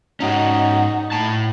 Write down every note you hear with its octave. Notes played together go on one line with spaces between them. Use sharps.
G#2 C#4 D#4 F#4
A2 A5